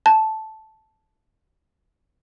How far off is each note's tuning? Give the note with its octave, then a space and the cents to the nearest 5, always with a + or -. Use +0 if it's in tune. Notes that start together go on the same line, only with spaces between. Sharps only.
A5 -10